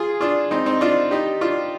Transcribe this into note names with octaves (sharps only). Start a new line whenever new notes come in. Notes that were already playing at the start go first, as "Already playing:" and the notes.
Already playing: F4 G#4
D4 F4
C4 D#4
C4 D#4
D4 F4
D#4 G4
D4 F4